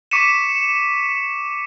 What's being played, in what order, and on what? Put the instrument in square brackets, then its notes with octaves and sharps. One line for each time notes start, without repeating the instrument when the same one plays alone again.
[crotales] C#6 D6 B6 C#7 D#7 E7